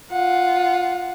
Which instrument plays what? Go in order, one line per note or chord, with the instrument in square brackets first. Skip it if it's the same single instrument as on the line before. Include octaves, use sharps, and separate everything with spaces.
[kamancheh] F4 F#5